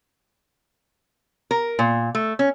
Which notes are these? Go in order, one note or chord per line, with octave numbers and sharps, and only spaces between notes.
A#4
A#2
A3
C#4